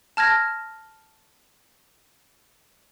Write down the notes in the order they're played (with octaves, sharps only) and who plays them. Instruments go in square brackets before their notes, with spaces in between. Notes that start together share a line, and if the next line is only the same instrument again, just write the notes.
[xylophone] A5 F6 G#6 A#6